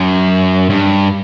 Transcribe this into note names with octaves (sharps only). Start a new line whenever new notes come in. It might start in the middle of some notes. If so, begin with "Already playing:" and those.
Already playing: F#2
G2